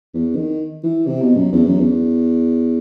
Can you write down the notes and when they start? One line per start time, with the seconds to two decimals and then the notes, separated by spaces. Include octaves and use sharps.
0.14 E2
0.36 D#3
0.83 E3
1.07 C3
1.22 B2
1.37 F#2
1.52 E2
1.66 F#2
1.79 E2